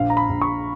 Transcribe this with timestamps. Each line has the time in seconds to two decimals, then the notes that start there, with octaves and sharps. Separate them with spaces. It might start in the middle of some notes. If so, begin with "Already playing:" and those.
Already playing: A#1 F5
0.10 A#5
0.17 B5
0.29 A#1
0.42 C#6